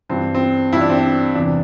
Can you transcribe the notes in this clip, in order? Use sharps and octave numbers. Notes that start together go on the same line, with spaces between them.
G2 E3 G3 C4
C4
G2 E3 G3 E4
D4
C4
D4
E2 C3 E3 D4